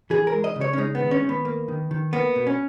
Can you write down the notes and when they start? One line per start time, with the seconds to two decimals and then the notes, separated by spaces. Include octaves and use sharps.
0.10 E3 G#4
0.27 A#4
0.33 G#3
0.44 D#5
0.56 C#3
0.61 C#5
0.73 C#4
0.77 G#3 D#4
0.95 B3
1.01 D#3
1.11 C#4
1.23 D#3
1.29 B3
1.45 A#3
1.68 D#3
1.91 D#3
2.13 A#3 B3
2.36 B2
2.47 C#4